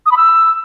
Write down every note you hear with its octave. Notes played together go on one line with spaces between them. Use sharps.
D#6
B5
E6